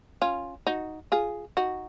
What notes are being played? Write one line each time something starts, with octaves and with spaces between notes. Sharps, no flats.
C#4 F4
D#4 F#4
F4 G#4
D#4 F#4